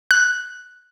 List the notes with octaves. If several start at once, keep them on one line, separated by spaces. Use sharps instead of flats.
F#6